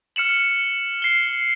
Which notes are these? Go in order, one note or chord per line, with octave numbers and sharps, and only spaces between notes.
F6 C#7 E7 F#7
C7 G7